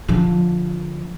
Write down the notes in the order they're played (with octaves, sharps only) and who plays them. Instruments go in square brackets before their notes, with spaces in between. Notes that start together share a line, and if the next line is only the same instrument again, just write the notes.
[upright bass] D3 F3